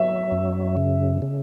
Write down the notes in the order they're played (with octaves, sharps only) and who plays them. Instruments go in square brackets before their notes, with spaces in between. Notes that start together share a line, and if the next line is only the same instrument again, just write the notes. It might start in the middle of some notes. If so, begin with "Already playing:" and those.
Already playing: [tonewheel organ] F#3 [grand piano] E5
[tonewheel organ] F#2
C#3
C#3